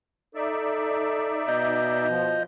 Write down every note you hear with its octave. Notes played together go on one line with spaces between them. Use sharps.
D#4 A4 D5 E5
B2 D#5 G6
F3